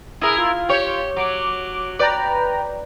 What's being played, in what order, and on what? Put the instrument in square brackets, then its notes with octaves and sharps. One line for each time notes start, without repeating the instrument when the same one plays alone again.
[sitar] E4 A#4 [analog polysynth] G#4 D#6
[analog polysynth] F4
[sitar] G4 C#5
[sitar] F#3 [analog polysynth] D6
[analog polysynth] B4 G5 A#5 [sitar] D5